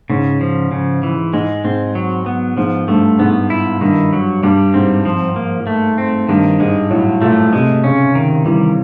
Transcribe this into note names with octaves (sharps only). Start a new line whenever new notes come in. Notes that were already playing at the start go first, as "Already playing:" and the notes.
G#2 C#3
F3
C#3
E3
G#2 G#3
G#2 C4
F#3
B3
G#2 F3
G2 A3
G#2 B3
E4
G2 D#3
F#3
G2 G3
G#2 C4
F3
A#3
A3
C4
G2 D#3
G#2 G#3
A2 F#3
A#2 A3
C3 G#3
C#3 C#4
D#3
E3 G3